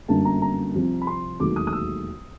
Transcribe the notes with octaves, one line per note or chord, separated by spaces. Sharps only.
G1 F#2 D3 F#3 A#3 A5
A#5
A#5
C2 C3 F3
B5
C6
E1 D#2 D#3 F#3 A3 D6
D#6
D#6
E6